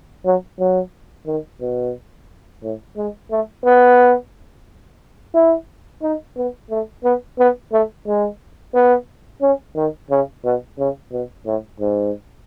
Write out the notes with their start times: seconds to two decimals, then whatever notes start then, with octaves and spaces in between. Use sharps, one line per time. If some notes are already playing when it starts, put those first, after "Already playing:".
0.25 F#3
0.59 F#3
1.27 D#3
1.61 B2
2.63 A2
2.97 G#3
3.31 A3
3.64 B3
5.34 E4
6.02 D#4
6.37 B3
6.70 A3
7.04 B3
7.39 B3
7.72 A3
8.07 G#3
8.74 B3
9.42 C#4
9.76 D#3
10.10 C#3
10.45 B2
10.79 C#3
11.12 B2
11.46 A2
11.80 G#2